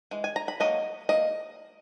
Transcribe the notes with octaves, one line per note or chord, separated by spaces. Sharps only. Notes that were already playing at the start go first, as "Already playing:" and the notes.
E3 G#3
G#5
A#5
B5
F#3 A#3 D#4 D#5
E3 A#3 D#5